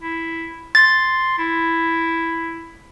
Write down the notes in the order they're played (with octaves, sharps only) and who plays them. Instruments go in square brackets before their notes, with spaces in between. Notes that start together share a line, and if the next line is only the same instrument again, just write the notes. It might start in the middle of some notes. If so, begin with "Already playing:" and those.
[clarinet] E4
[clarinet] C6 [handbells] A6
[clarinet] E4